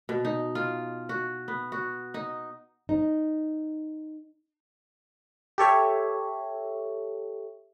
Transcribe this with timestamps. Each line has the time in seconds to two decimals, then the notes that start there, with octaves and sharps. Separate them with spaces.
0.09 B2
0.25 D#4
0.55 F4
1.09 F#4
1.48 B3
1.72 F#4
2.14 D#4
2.89 D#4
5.58 G4 A4 C#5 E5